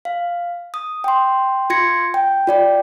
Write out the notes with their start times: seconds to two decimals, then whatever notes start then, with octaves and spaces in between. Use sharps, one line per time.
0.05 F5
0.74 D#6
1.04 G5 C6
1.70 F4 C6 G#6 A#6 C#7
2.14 G5
2.47 F4 D5 G5